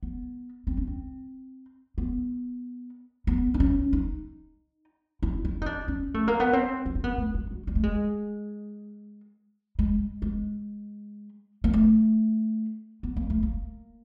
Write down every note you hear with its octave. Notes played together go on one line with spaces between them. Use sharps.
B3
C4
C#4
C4
B3
B3
D4
C#4
D#4
E4
E4
D#4
D4
C#4
A3
A#3
B3
C4
B3
C4
B3
A3
G#3
F#3
G3
A3
G#3
G#3
G#3
A#3
A3
B3
A#3
A3
A#3